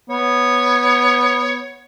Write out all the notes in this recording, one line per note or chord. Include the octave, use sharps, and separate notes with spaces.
B3 C#5